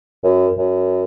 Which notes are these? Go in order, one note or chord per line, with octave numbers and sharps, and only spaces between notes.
F#2
F#2